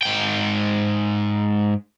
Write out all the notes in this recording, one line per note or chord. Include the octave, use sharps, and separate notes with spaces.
G#2 G5